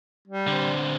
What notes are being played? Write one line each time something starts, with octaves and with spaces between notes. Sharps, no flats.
G3
D3 C4